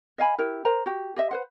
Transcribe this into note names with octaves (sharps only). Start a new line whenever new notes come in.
D#5 F5 G#5 B5
E4 G4 A#4
A#4 C5 A#5
F#4 G4
G4 D#5 E5
B4 C5 F#5